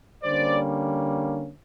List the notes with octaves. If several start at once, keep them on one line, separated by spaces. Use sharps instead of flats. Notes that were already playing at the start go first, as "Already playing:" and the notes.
D3 G3 A#3 C#4 C5 D5